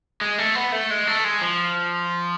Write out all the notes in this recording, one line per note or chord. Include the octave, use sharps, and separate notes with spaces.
G#3
A3
B3
A3
G#3
A3
G#3
F3